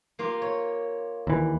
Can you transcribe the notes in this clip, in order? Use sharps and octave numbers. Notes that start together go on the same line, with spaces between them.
A#3 F4 G4
C#5
D#2 E3